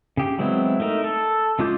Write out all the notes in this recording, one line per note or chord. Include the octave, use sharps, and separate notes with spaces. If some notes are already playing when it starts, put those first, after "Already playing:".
C#3 G4
F#3 G#3 B3 C4 E4
A3 D#4 A#4
A4
C#3 G#3 F4 D6 G6